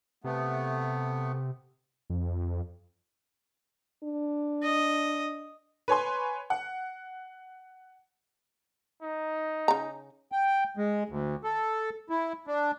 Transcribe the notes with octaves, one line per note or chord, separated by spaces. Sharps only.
C3 A3 B3
F2
D4
D#5
B4 C#5 G#5 C6
F#5
D#4
C#3 A#5
G5
G#3
D2
A4
E4
D4